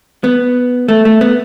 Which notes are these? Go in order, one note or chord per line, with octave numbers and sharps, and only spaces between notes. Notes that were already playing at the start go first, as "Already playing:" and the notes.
B3
A3
A3
B3